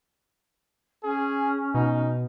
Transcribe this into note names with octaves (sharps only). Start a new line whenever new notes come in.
C#4 G#4
B2 D#4